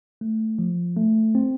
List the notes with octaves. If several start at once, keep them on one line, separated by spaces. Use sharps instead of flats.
A3
F3
A3
C4